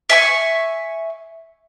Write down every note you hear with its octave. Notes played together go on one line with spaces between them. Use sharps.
E5 G#5 C#6